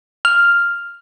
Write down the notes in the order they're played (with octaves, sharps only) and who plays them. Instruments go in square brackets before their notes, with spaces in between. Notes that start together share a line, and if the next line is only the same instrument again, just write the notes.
[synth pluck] F6